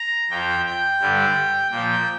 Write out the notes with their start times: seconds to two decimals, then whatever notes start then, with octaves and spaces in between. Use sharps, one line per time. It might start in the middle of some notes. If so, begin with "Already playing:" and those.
Already playing: A#5
0.30 F2 F3 G5
0.66 G5
1.00 G2 D3 G3
1.71 A#2 F3 G5